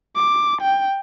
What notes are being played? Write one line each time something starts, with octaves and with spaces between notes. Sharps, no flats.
D6
G5